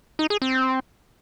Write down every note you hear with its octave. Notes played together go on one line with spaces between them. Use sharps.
D#4
G#4
C4